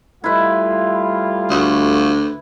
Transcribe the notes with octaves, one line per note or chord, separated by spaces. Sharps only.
G3 A3 E4 F4 B4
D2 F#4